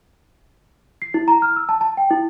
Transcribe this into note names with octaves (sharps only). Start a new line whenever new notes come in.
C7
E4
A#5
F6
E6
A5
A5
G5
E4